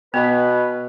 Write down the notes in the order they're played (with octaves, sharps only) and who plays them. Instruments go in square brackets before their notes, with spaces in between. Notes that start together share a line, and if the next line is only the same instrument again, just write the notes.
[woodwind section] B2 B4 [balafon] B3